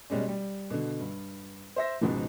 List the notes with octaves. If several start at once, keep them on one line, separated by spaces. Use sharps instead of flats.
B2 G3 G#3 C#4
G3
B2 D3
G2
C5 E5 A#6
C#2 G#2 B2 F3